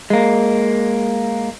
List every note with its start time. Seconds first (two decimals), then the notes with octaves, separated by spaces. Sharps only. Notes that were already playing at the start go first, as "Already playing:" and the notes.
0.10 G#3 A#3